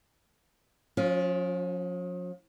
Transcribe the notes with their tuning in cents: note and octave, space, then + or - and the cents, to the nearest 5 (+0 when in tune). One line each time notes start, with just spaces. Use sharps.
F3 +45 C#4 +0 F4 +0